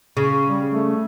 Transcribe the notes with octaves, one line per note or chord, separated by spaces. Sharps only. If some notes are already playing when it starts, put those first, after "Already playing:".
C#3
G3
A3